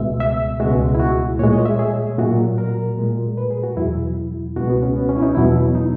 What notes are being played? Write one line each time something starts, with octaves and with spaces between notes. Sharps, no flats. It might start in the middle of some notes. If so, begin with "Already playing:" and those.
Already playing: C#2 B2 G#3 E5
E5
C#2 B2 G#3 F#4
E4
F#4
A#2 G#3 C#5
D#5
E5
G#4
A#2 F#3 F#4
A#4
A#2 G#3
B4
G#4
F#4
E2 B2 F#3 E4
C#2 B2 G#3 F#4
B3
C#4
B3
C#4
E4
D#4
E2 B2 F#3 E4
D#4